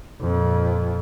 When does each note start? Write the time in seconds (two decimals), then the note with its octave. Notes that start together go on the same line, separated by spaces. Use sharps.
0.21 F2 A#2